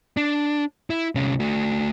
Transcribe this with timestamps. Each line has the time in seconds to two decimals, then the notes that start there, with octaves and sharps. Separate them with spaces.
0.17 D4
0.90 E4
1.15 C2 C#4
1.40 A3 F#4